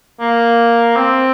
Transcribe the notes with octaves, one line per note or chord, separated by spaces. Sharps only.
A#3
C4